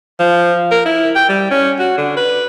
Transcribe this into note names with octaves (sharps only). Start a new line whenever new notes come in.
F3
A#4
E4
G5
G3
C#4
F#4
D3
B4